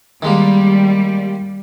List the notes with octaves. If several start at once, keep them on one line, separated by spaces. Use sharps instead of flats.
D#3 G3 G#3 A#3